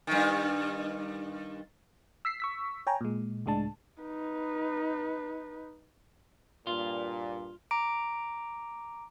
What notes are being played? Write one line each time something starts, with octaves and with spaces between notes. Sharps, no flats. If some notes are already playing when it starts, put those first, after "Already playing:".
G2 D#3
E6 B6 C7
C#6 E6 B6
C#5 G5 G#5 A#5
A#2 G#3
C#2 A2 G#3 D4 A5
D#4 B4
G2 A#2 F4
A#5 D6 D7